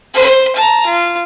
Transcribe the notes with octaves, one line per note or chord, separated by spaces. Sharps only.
C5
A5 A#5
F4